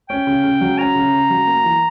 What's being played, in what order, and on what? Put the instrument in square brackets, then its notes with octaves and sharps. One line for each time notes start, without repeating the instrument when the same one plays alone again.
[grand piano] C#4 [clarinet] G5
[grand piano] C#3
C#3
F#3
[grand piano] C#4 [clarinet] A#5
[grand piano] C#3
C#3
F#3
A#3
E3